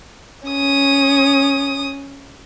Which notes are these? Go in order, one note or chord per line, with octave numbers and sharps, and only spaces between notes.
C#4 D#6